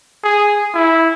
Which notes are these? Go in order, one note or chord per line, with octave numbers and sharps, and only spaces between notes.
G#4
E4